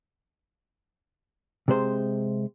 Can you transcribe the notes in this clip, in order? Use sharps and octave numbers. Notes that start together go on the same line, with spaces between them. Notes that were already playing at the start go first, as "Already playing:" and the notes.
C3 G#3 C5